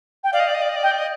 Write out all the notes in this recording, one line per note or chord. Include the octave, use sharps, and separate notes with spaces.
G5
D5 F5
D#5
D5
D#5
D5
D#5
D5
D#5 G5
D5
D#5